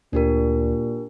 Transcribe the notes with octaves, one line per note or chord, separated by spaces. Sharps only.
D2 A#2 D4 G4 A#4